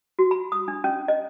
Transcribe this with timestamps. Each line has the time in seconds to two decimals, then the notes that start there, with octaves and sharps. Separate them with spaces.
0.19 F#4
0.31 B5
0.52 D#6
0.68 D4
0.84 C#4
1.08 D#5